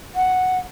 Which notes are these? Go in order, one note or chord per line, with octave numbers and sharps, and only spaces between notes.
F#5